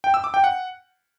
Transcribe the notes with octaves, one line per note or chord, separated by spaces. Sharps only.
G5
E6
D6
G5
F#5